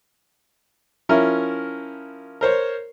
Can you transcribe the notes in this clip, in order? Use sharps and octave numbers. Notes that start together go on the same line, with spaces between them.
F3 C#4 E4 A#4
A#4 C5 C#5